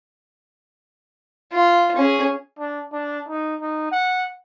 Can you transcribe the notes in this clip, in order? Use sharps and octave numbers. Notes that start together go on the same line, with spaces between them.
F4
C#4 G#4
D4
D4
D#4
D#4
F#5